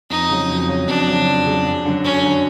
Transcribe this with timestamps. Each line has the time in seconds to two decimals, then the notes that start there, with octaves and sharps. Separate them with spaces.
0.10 F2 D#4
0.29 C#3 F#3
0.49 F2
0.69 C#3 F#3
0.88 F2 D4
1.07 C#3 F#3
1.26 F2
1.46 C#3 F#3
1.66 F#2
1.85 D3 F#3
2.04 F#2 C#4
2.23 D3 F#3